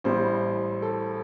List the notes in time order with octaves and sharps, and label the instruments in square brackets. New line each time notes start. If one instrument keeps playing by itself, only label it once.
[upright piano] A1 A2 G3 C5
A4